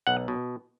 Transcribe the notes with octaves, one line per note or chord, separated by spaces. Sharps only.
B1 F#5
B2